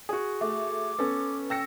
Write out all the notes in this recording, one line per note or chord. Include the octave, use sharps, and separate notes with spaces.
F#4 G#4
A3 D6
B3 C#4 A4
G5 E6 A#6 C#7